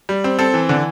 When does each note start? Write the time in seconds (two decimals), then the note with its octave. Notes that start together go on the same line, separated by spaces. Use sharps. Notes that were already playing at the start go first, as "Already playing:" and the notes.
0.09 G3
0.24 C4
0.39 C4 A4
0.54 E3
0.69 D3